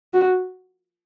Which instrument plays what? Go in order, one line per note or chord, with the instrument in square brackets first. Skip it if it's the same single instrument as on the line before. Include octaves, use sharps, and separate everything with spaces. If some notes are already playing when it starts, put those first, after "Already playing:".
[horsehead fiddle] F#4